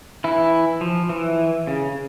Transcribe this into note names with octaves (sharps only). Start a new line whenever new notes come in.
E3 E4
F3
E3
C#3